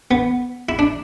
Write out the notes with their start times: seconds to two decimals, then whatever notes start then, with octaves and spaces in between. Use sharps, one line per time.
0.11 B3
0.69 E4
0.79 D4